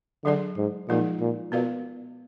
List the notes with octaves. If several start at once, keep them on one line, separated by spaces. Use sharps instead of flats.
D3 F#3 D4 G#4 D5
G#2
A#2 F3 G#3 D#4 G#4
A#2
B2 B3 F4 A#4 D5 F5